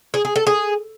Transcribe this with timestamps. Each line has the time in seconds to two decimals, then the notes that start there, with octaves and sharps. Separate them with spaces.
0.14 G#4
0.25 G#4
0.36 A4
0.47 G#4